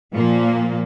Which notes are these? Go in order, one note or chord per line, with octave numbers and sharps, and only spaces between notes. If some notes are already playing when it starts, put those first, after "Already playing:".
A#2 F3 A#3